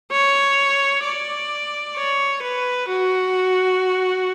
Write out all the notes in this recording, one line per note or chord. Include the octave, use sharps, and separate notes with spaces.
C#5
D5
C#5
B4
F#4